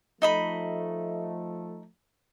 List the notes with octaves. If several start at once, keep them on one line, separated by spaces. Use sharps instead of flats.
F3 A3 D#4 D#5 B5